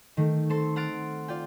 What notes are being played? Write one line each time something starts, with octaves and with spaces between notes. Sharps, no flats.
D#3 A3
C4 A4 C6
F#5 C6 F6 A6 D7
F4 D5 G5